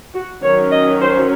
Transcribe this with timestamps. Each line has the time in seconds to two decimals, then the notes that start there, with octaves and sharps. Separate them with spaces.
0.14 F#4
0.43 D#3 F#3 C#4 C#5
0.71 D#5
1.01 C5